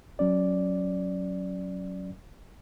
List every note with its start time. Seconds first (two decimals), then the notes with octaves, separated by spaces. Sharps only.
0.19 F#3 C#4 D5